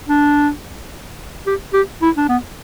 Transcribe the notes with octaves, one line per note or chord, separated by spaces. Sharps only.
D4
G4
G4
E4
D4
B3